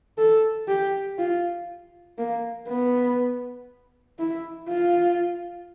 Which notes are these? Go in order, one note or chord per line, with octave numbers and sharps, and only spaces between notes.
A4
G4
F4
A#3
B3
E4
F4